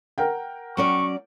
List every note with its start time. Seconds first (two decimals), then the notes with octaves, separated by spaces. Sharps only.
0.18 A#4 F#5 G5
0.77 F#3 C#4 D5 C#6